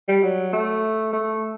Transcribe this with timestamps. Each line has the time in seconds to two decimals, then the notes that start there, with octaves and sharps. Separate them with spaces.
0.08 G3
0.23 F#3
0.53 A3
1.13 A3